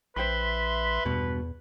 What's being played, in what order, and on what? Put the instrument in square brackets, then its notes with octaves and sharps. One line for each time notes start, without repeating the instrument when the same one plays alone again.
[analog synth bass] A#1 [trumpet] B4 [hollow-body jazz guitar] C5 G5 B5 [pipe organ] E5 C6
[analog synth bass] E2 [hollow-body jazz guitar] G2 B2